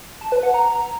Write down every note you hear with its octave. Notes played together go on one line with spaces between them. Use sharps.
A5
B4
F#5
A#5